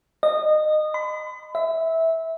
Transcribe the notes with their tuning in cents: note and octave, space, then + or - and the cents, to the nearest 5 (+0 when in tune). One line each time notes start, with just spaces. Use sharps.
D#5 -20
B5 +40
E5 -15